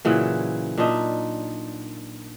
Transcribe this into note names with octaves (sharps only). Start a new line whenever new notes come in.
A#2 C#3 E3 F#3
A#2 D4 D#4 E5